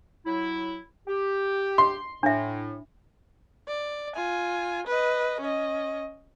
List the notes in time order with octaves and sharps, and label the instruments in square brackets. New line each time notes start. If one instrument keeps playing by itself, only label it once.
[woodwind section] F#3 E4
G4
[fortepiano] C6
[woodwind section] A2 [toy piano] D4 E5
[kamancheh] D5
F4 G#5
B4 D#5
C#4 D#5